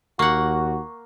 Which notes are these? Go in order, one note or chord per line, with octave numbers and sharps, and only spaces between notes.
D#2 A#3 F#4 F#5 C#6